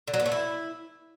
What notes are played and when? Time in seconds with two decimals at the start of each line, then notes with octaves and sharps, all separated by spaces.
0.08 D3
0.14 F#3
0.20 B3
0.26 A3
0.32 E4